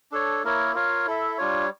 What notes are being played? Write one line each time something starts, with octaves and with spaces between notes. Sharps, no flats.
D4 A4 C#5
A#3 E4 A#4 C#5
F4 A#4 C#5 F5
E4 A4 E5
G3 D4 F4 C#5